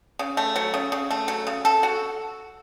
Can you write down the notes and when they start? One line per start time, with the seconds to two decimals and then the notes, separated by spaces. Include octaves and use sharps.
0.19 C#3
0.37 A3
0.56 F#3
0.74 C#3
0.92 C#3
1.11 A3
1.28 F#3
1.47 C#3
1.65 A4
1.83 F#4